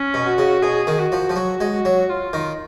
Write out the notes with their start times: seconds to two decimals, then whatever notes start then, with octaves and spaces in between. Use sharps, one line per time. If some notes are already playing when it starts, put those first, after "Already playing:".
Already playing: C#4
0.14 B2
0.26 F#4
0.38 C#3
0.62 B2 G#4
0.87 D#3
0.99 F#4
1.12 F3
1.30 F3
1.36 F#3 F#4
1.61 G#3
1.73 F#4
1.85 F#3
2.09 F4
2.33 D#3